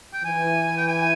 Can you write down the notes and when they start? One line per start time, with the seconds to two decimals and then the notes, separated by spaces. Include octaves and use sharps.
0.13 G5
0.24 E3 G#5
0.78 G5
0.88 G#5